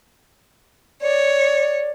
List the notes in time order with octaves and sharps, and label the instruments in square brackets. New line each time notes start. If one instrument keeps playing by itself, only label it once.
[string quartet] C#5 [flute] D5